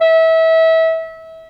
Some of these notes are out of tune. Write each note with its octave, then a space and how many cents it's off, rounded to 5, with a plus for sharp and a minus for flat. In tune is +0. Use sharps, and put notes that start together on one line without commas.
E5 -25